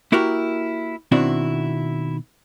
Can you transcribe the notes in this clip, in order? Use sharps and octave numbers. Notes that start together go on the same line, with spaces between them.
A#3 E4 F#4 G4 A#4
B2 D#3 C4 D4 E4 F#4